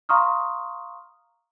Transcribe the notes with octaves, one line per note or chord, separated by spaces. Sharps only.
F5 A#5 C6 C#6 D#6 F6